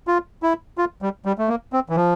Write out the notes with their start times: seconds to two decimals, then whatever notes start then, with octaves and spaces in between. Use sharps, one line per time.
0.07 F4
0.43 E4
0.78 F4
1.02 G3
1.25 G3
1.38 A3
1.48 A#3
1.73 C4
1.89 E3
1.96 F3